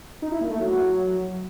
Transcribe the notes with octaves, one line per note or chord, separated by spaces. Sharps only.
D#4
E4
A#3
A3
F#3